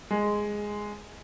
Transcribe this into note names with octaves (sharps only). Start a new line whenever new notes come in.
G#3